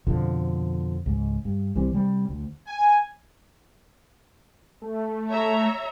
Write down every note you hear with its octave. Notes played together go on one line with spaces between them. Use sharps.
F2 B2 D3 F3
C#2 G#2
G2
C2 E3 G3 C4
C3 G3
D2
G#5
A3
C#5 E5 A#5